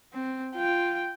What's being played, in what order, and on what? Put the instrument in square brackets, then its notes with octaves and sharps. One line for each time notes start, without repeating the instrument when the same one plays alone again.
[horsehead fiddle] C4
F4 G5